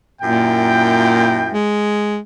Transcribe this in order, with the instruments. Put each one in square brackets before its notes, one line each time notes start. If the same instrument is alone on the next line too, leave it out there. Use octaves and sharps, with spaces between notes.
[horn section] F#2 E4 G5 [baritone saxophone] A#2
[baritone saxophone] G#3